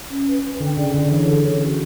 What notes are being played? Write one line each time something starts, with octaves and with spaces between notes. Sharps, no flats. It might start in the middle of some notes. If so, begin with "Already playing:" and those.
C#4
B4
C#4
D3 G5
C#3 D5
D3 E4
D3
E3 C#5
D3 A4
D3 C#4
F#4